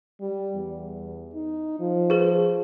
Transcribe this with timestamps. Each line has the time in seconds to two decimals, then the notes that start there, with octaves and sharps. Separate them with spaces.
0.20 G3
0.55 E2
1.34 D#4
1.79 F3
2.10 G#4 B4